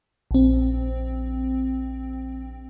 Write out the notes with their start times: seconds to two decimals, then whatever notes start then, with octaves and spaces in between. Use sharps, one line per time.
0.31 A#1 C4